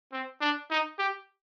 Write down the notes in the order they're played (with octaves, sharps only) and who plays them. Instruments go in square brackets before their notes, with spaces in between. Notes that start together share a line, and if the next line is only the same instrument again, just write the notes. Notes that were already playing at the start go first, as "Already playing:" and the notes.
[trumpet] C4
D4
D#4
G4